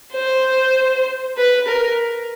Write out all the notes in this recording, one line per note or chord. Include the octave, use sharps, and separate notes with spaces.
C5
B4
A#4